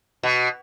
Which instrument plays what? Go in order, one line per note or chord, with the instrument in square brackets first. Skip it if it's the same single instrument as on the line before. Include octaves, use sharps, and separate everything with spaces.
[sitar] B2